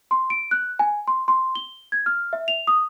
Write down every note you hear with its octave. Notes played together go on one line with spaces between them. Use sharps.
C6
D7
F#6
G#5
C6
C6
G7
G#6
F6
E5
F7
D#6